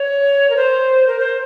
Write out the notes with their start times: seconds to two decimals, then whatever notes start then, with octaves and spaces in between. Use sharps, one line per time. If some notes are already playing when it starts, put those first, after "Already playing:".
Already playing: C#5
0.50 A#4
0.56 C5
1.07 A#4
1.20 C5